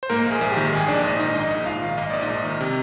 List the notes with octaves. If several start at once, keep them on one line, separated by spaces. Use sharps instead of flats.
C5
G#2 A#3 A#4
A#1 G#4
A#1
G4
D#3
G#2 G#4
A#1 D4 D5
A#1 D#4 D#5
D#3 D#4 D#5
G#2 D#4 D#5
A#1
A#1 F4 F5
D#3
G#2 D#5
A#1 D5
D#4 D#5
A#1
D#3
C3